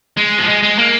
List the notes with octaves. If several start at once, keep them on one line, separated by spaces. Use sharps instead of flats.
G#3
F3
G#3
G#3
A#3